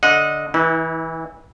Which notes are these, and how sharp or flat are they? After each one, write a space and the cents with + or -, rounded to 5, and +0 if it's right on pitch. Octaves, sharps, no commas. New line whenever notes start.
D3 +0 D#5 +0 F#5 -30
E3 -20 E4 -45